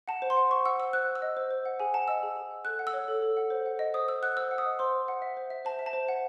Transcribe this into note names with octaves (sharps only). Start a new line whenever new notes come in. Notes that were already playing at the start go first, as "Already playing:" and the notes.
F#5 A5
C5
C6
F#5
C5 C#6
F#5 E6
C5 E6
C5 F#6
F#5
E6
D#5
C5
C5
F#5
G#4 G#5
F#5 A5
D#5 E6
G#4
G#4
F#5
A4 F#6
F#5
E6
C#5
A4
A4
F#5
C5
F#5
D#5
C5 D#6
C5 E6
F#5 F#6
C5 E6
F#5
D#6
D#5
C5 C6
C5
F#5
E5
C5
E5
C5 A5
E5
A5
C5
F#5